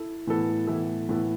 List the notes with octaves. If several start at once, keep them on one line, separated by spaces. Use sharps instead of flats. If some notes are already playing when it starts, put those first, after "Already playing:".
Already playing: E4 A4
A2 E3 B3 E4 A4
A2 E3 B3 E4 A4
A2 E3 B3 E4 A4